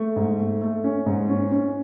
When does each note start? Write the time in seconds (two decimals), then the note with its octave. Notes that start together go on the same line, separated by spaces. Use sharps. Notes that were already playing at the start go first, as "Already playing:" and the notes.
Already playing: A3
0.16 G#2
0.39 A3
0.62 A3
0.84 C#4
1.06 G#2
1.29 C#4
1.52 C#4